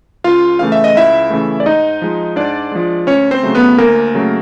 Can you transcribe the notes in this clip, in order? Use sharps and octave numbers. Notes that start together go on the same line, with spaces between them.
C#2 F4 F5
C#3 E3 A3 F5
E5
D#5
C#2 E4 E5
C#3 E3 A3
D5
G#2 D#4 D#5
F3 G#3
G#2 D4 D5
F3 G#3
D2 C#4 C#5
C4 C5
C#3 F#3 A3
B3 B4
D2 A#3 A#4
C#3 F#3 A3